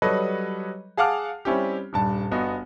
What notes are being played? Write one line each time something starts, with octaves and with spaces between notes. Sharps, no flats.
F#3 G3 A4 B4 C#5 D#5
G#4 F5 F#5 A5 D6 F6
G3 C4 C#4 E4 G4
D#1 G2 A5
G1 B3 F#4 D#5